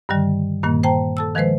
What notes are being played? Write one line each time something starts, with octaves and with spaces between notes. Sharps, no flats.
G2 D3 D#3 G3
G2 A#2 D#3 A#3
C5 G5 A5 A#5
A4 A5 E6
D#3 F3 G#3 B4 C5